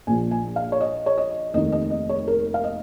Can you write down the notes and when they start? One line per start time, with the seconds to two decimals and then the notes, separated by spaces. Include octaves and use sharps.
0.07 A#1 A#2 F3 G#5
0.31 G#5
0.56 F5
0.72 C#5
0.81 D#5
1.06 C#5
1.18 D#5
1.54 F1 D#2 D#3 D#5
1.72 D#5
1.90 D#5
2.09 C#5
2.28 A#4
2.54 F5
2.64 D#5